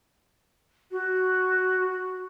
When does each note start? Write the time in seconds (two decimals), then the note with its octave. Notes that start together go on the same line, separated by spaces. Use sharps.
0.91 F#4